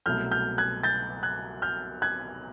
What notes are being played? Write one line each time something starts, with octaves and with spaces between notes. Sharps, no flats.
C2 B2 F#3 A3 F6 G6
F6 G6
F#6 G#6
G6 A6
F#6 G#6
F6 G6
F#6 G#6